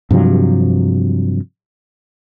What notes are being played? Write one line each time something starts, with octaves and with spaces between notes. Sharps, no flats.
G2 C3 F3 F#3